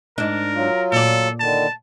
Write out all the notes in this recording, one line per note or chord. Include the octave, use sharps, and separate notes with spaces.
G#2 D4 A#4
F#3 F4
A#2 A4 D5
D3 D#3 A5